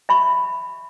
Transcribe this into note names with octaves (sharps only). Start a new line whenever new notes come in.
E5 B5 C#6